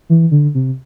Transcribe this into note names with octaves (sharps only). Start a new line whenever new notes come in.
E3
D3
C3